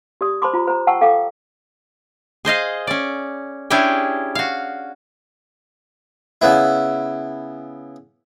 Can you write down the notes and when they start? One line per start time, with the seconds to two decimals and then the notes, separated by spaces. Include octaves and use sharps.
0.21 G4 D5 D#6
0.42 C5 A5 B5 C6 D6
0.54 F4 A#5
0.67 C5 A#5
0.87 F#5 G5 A5 C#6 E6
1.01 A4 F5 G5 D6
2.45 G#4 C5 D#5 F5
2.87 C#4 D5
3.70 C#4 D4 E4 G4 G#4 G5
4.35 F#4 F5
6.42 C#3 B3 E4